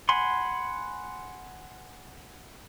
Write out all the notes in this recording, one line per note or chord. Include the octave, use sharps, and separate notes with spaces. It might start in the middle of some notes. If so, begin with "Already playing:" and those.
F#5 G#5 B5 C6